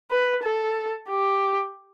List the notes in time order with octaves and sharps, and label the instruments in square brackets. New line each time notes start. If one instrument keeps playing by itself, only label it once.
[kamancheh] B4
A4
G4